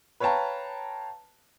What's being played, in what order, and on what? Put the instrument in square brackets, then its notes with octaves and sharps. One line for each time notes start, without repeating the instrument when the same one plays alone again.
[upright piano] B4 C#5 F5 G5 A5 A#5